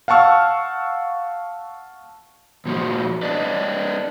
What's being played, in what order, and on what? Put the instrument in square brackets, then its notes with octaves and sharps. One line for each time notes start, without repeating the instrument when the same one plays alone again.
[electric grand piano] F5 F#5 A5 C#6 E6 F6
[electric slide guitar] A#2 F3 F#4
D4 B4 D5 D#5